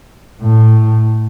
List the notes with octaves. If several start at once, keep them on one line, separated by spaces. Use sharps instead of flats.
A2